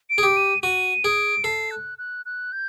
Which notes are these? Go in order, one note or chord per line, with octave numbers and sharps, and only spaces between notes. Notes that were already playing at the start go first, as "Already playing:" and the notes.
D7
G#4
G4
D#7
F#4 D#7
G#4 D7
A4 C7
F#6
F#6
F#6
G6